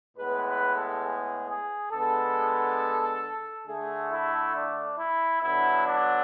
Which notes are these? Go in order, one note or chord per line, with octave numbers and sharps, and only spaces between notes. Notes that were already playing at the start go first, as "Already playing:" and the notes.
A2 G#3 B3 B4
B4
A4
G#4
G#4
D3 G#3 B3 A4
D3 A3 G#4
E4
D4
E4
D3 F#3 B3 E4
D4